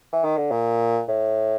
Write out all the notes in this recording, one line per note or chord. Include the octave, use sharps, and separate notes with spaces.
E3
D#3
D3
A#2
A2